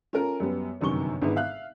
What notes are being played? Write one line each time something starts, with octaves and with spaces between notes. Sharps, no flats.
C#4 F4 A4 A#4 A#5
F#2 G3 B3
G1 F#2 C3 D#3 C#6 G7
G#1 G#2 D3 B3 E4
E5 F5 F#6